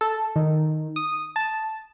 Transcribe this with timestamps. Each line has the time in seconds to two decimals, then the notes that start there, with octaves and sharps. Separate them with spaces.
0.01 A4
0.36 D#3
0.96 D#6
1.36 A5